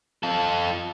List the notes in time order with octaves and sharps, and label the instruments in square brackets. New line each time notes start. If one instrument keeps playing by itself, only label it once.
[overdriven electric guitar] F4 A4